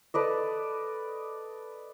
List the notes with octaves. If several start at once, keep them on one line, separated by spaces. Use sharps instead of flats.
A4 B4 D5 D#5